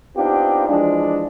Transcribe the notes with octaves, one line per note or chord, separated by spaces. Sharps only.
B3 C4 D4 D#4 F4 G4
E3 F3 G#3 D4